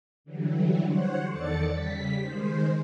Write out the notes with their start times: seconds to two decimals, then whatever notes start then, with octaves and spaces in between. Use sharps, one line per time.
0.24 D3 E3 F#3 G3
0.85 C5 C#5 F#5
1.29 E2 D#3 A4 D5 A6 C#7
1.72 C#3 G3 B6
2.19 D#3 G#3 C5